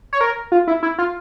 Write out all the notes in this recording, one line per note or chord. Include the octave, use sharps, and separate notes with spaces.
C#5
A#4
F4
E4
E4
F4